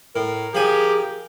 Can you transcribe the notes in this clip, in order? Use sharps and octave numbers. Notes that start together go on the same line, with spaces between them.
A2 A#4
F3 G4 G#4 G#5